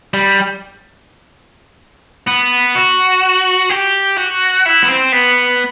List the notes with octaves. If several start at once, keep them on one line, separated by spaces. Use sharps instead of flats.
G3
B3
F#4
G4
F#4
E4
B3
C4
B3